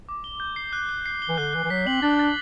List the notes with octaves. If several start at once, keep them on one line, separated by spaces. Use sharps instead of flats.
D6
G7
G6
C7
F#6
F#6
C7
G7
E3
D3 F#6
E3 F#6
E3
F#3 B6
C4 F#7
D4 A6
A6